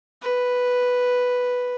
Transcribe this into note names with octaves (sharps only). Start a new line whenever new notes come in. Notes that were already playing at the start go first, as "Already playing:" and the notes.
B4